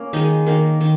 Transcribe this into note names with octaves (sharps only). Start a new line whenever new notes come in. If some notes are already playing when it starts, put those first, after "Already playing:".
Already playing: A#3 C#4
D#3 G#3 D#4
D#3 A#3
D#3